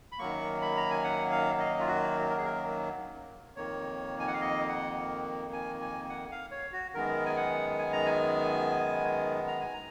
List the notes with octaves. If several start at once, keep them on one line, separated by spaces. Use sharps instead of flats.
B5
F#2 D#3 F#3 A#3 C#6
B5
A#5
G#5
F#5
F5
D#5
F4
F#4
A#4
G#4
A#4
F2 D#3 A#3 C#5
G#5
F#5
F5
D#5
F#5
G#5
G#5
F#5
F5
C#5
F#4
F#2 D#3 G#3 B3 A#4
G#5
F#5
G#5
A#5
G#5
A#5
G#5
A#5